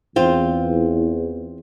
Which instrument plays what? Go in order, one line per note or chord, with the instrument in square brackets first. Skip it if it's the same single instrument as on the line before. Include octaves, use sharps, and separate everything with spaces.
[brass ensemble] E2 [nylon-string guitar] C4 F4